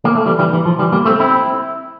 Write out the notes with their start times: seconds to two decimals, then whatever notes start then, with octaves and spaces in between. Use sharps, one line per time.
0.05 A#3
0.15 A3
0.26 E3 G3
0.39 E3 G3
0.53 E3
0.66 F3
0.79 E3 G3
0.92 G3 A#3
1.05 A3 C4
1.20 C4 E4